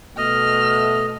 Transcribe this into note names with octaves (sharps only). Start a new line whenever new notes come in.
B2 A3 D#5 F6